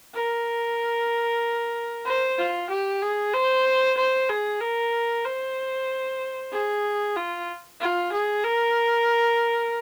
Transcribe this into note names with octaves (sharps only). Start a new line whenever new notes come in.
A#4
C5
F4
G4
G#4
C5
C5
G#4
A#4
C5
G#4
F4
F4
G#4
A#4